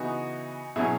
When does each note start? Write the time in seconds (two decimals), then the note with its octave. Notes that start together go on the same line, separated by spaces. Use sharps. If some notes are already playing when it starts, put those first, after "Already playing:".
Already playing: C#3 E3 B3 D#4 F#4
0.76 B2 F#3 C#4 E4 G#4